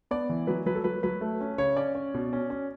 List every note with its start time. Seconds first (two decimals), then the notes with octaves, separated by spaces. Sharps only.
0.11 B3 D5
0.29 E3
0.47 F#3 B4
0.66 F#3 B4
0.75 A4
0.84 F#3 B4
1.03 F#3 B4
1.21 A3
1.40 C#4
1.58 C#3 C#5
1.76 C#4 D5
1.95 C#4
2.14 B2
2.33 C#4
2.50 C#4